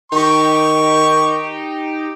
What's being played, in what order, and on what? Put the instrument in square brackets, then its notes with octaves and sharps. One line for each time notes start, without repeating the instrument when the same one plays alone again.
[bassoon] D#3 [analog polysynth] D#4 G4 [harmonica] C#6